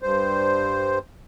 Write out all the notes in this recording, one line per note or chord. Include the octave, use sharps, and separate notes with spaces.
G2 C5